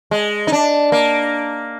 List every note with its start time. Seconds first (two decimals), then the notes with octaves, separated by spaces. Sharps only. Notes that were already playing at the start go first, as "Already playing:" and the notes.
0.11 G#3
0.47 D#4
0.52 D4
0.92 A#3